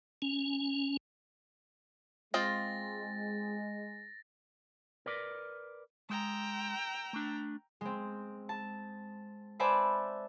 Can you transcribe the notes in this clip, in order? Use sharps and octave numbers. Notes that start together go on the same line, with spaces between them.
C#4
G#3 C4 F4 D#5 A6 A#6
A#4 B4 D5
G#3 G5 A#5 E6
A3 D4
G#3 C4
A5
B4 C5 D5 E5 G#5 A5